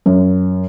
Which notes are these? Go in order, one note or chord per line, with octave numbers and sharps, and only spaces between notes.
F#2